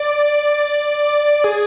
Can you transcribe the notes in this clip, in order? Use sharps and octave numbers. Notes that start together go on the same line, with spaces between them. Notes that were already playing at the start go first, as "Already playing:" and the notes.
Already playing: D5
G#4